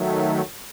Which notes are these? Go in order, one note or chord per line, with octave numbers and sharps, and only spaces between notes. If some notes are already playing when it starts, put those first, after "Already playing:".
Already playing: D#3 F#3 A3